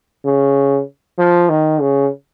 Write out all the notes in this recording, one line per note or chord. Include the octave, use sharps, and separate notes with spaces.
C#3
F3
D#3
C#3